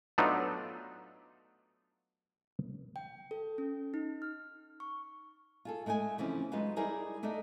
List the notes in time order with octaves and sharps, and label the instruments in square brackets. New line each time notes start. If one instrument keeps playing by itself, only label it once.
[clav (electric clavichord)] F#3 A3 B3 D4 D#4 F4
[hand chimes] G5
A4
C#4
D#4
F6
C#6
[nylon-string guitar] F4 G#4 A4
G#3 A3 G#4 G5 G#5
C#3 E3 F3 C4 C#4
F#3 G#3 D#4 F4 B4
G3 D#4 E4 G#4 A#4 D5
A3 D4 D#4 A4 D#5